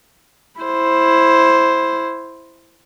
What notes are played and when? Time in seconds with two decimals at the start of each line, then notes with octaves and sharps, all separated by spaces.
0.61 E4 C5